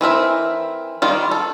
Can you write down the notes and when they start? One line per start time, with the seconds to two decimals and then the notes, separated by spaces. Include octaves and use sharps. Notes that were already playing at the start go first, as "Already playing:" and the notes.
0.01 E3 C4 A#4 E5
1.02 D#3 G3 F4
1.31 A4